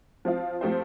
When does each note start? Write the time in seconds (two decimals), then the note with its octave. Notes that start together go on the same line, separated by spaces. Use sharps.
0.25 F3 C4 F4
0.61 F3 A3 C4 G4 C5